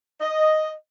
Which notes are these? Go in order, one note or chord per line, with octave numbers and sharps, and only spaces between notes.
D#5